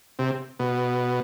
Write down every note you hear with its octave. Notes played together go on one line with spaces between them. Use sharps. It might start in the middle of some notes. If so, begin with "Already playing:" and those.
C3
B2